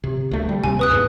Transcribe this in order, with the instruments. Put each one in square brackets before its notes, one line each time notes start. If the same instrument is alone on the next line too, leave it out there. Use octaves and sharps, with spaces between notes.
[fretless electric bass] C3
D2 A3
G3
[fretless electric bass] D#2 C3 [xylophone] G#5
[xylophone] B4 D#6 F#6
[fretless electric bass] E2 G#2